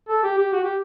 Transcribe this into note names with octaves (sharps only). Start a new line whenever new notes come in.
A4
G4
G4
F#4
G4